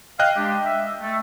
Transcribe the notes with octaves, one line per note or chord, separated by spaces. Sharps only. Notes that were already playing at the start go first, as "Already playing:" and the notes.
D#5 F5 G5 F#6
G#3 D4 G4
E5
A3